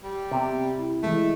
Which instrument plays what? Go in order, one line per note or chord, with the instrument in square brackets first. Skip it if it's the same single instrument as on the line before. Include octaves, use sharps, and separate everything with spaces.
[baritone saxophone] G3
[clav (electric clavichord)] C3 [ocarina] B3
[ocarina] C4
E4
[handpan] E3 G#3 [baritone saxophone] A3